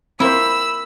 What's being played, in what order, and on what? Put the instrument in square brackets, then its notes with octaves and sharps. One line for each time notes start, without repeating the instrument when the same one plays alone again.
[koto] A#3 E4 [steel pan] C4 C5 [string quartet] B5 [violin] E6